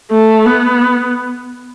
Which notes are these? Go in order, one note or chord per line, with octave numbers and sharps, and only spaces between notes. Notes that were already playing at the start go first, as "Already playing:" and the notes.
A3
B3